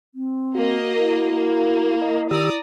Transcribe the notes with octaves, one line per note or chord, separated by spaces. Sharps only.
C4
A#3 F#4 D#5
E4
A#3
D#5 A#5
D#3 G4 D5 A#5 D#6 E6